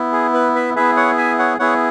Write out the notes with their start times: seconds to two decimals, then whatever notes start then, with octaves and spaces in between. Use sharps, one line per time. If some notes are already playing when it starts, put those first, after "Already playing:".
Already playing: B3 E4
0.12 G#4
0.34 B4
0.55 B4 E5
0.76 B3 E4 G#4 B4 E5
0.96 C#5 F#5
1.17 E5 G#5
1.39 C#5 F#5
1.59 B3 E4 G#4 C#5 F#5